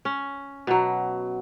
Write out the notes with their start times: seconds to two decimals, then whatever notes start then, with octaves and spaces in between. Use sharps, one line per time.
0.05 C#4
0.67 B2 F#3